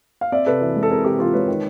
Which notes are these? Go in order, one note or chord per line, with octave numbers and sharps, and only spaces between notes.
F5
C4 D5 E5
C3 A4 B4
E3
G#3
A4
C4 G#4 A#4
C3 G4 A4
E3 F4 G4
G#3 B4 C#5
D#3